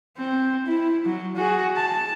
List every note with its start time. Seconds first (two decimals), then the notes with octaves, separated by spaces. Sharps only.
0.17 C4
0.66 E4
1.05 F#3
1.36 F#4 G#4
1.76 A5